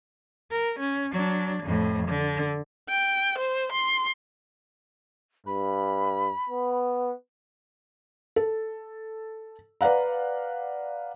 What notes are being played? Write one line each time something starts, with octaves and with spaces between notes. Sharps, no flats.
A#4
C#4
F#3 D4
F2 A2
D3
G5
C5
C6
G2 B5
B3
A4
B4 D5 F5 F#5 A#5